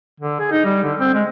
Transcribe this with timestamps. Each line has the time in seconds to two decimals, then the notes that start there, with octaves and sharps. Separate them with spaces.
0.20 D3
0.40 G#4
0.52 D#4
0.65 G3
0.84 D3
1.00 C4
1.14 G#3